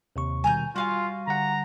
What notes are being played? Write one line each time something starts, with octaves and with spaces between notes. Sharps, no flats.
D#2 C3 C#6
B2 D#3 G3 G#5 A#5 G6
G3 F4 F#4 F5 G#5
D3 G3 F#5 A#5